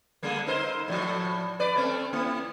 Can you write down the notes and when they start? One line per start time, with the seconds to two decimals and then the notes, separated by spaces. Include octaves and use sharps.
0.23 D3 G3 A#3
0.47 D#4 A#4 C5
0.88 A2 E3 F3
1.59 B4 D5
1.76 A3 C4
2.13 A#3 E4